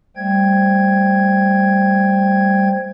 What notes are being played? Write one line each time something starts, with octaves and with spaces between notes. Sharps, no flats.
G3 A3 C5 G5 G#6